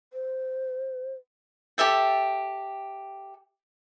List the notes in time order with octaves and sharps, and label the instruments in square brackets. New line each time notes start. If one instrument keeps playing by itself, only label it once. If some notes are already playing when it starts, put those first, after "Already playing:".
[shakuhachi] C5
[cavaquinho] G4 A4 E5 G5